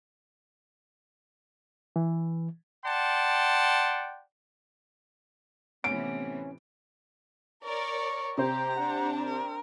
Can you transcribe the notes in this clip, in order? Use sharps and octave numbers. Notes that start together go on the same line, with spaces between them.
E3
D5 F#5 G5 A5 C6
A2 C3 E3 B3 C#4 D7
A#4 C#5 D5 C#6
C3 G4 C5 A#5
D4 F#5
C4 A#4